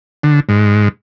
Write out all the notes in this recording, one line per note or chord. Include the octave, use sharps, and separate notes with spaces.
D3
G#2